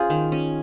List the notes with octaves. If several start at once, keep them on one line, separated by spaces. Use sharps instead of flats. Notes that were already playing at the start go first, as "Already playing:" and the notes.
Already playing: C#4 F4 G#4 C5
D#3
C#4